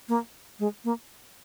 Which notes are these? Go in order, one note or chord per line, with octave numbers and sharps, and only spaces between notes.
A#3
G#3
A#3